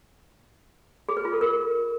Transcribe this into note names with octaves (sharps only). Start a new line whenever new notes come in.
G#4
B4
F4
A4
A#4